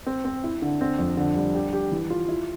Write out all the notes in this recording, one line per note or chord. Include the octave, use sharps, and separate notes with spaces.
C4
C4
E4
D3
C4
F2
D3
G3
G4
G4
E3
F4
E4